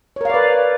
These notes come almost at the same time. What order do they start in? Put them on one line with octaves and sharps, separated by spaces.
C#5 A#4 F5 D5 B4